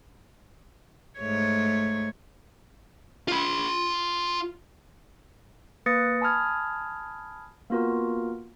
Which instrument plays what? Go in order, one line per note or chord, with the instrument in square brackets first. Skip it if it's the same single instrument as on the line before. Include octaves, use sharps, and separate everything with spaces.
[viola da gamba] G#2 A3 C#5
[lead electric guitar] F4 B5
[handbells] A#3 B4 D#6 A6 A#6 C#7
G#5 A5 B5 D#6 F6 G#6
A#3 B3 F4 F#4 A#4